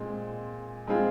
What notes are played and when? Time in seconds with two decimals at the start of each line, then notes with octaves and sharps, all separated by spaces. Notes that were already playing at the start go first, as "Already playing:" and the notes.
Already playing: A#2 G#3 C4
0.87 G#3 C4 F4 G#4